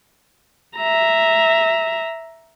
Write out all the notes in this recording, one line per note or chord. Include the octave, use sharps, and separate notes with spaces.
E5 A#5